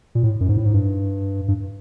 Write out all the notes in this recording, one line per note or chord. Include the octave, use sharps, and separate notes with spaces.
A#2
A2
F#2
G#2
A2
G#2
G2
G2